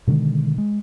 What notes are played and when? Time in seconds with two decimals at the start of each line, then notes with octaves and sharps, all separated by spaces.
0.07 B2 D3 D#3 G#3
0.58 G#3